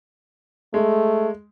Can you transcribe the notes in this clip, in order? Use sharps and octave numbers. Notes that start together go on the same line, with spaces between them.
G#3 A3